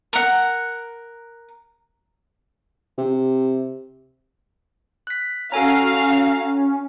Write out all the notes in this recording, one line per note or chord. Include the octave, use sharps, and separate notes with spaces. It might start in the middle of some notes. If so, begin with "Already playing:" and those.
A#4 F#5
C3
F#6 B6
C#4 F#4 A4 F5 G#5 A#5